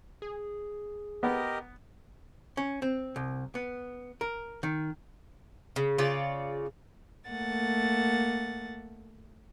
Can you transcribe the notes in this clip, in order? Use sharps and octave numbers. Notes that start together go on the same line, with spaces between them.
G#4
B3 G4 A#4 D#5
C#4
C4
C2
B3
A#4
D#3
C#3
C#3 F4 C#5 D5
A3 A#3 F#5 A6